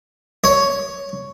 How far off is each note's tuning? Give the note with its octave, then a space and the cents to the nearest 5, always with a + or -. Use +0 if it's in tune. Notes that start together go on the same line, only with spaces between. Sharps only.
C#5 +5